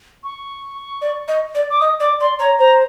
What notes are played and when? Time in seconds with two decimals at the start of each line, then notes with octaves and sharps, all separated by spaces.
0.24 C#6
1.02 D5
1.28 D#5
1.55 D5
1.70 D6
1.80 D#5 D#6
2.00 D5 D6
2.20 D5 C6
2.39 C#5 A#5
2.58 C5 A#5